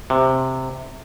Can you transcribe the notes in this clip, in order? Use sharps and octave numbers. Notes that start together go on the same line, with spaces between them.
C3